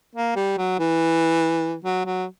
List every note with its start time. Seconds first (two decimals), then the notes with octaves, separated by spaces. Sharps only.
0.15 A#3
0.36 G3
0.58 F#3
0.79 E3
1.84 F#3
2.06 F#3